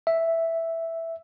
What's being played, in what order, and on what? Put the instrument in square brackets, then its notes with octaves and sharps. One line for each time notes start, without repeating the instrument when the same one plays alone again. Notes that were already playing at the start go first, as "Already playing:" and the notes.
[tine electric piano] E5